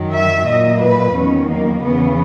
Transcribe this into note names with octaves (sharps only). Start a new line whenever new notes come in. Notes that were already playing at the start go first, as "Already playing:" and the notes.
Already playing: F#2 D#3 F#3
E5
A#2 F#3 D#5
B4
E2 D#3 F#3 C#4
A#3
E2 C#3 E3 B3